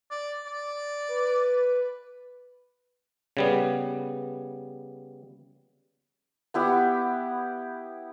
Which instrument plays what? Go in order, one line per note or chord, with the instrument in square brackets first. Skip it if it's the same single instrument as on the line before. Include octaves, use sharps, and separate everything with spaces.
[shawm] D5
D5
[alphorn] B4
[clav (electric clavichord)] C#3 G3 B3
[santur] B3 E4 G4 F#5